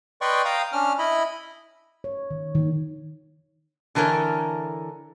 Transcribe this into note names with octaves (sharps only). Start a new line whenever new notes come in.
B4 D5 D#5 G5 C6 C#6
F5 G5 A#5 D#6
C#4 D4 F6
E4 D#5 B5
C#5
D#3
D#3
D3 E3 A4 A#4 C#5